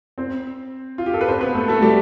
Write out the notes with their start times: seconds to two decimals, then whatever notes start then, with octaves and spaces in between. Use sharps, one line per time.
0.18 C4 C5
0.98 F4
1.06 G4
1.14 A4
1.21 B4
1.28 C4 C5
1.41 B3 B4
1.55 A3 A4
1.68 A3 A4
1.82 G3 G4